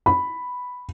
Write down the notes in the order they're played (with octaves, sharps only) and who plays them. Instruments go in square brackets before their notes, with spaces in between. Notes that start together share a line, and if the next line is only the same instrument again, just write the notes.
[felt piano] B5